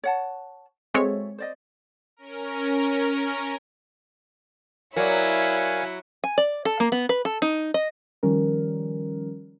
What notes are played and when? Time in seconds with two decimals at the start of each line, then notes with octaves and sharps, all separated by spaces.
0.04 C#5 F#5 A5
0.94 G#3 C4 F#4 A4 C#5 E5
1.38 C5 D5 D#5
2.17 C#4 A#4
4.97 F#3 E4 A#4 C#5 D5 F5 G#5 B5
6.24 G#5
6.38 D5
6.65 A4
6.80 A#3
6.92 B3
7.09 B4
7.25 A4
7.42 D#4
7.74 D#5
8.23 D#3 F3 G3 C#4 A#4